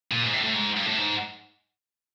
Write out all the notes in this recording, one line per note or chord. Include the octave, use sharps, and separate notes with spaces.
A#2
G#2
A2
A2
G#2
G2
A2
G#2